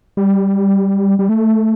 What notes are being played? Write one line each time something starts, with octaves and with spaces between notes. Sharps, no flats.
G3
G3
A3